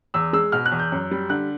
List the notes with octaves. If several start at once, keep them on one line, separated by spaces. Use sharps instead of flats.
E2 E6
G#3 E6
B2 F6
F#6
E2
G6
F#2
G3
D3 F#6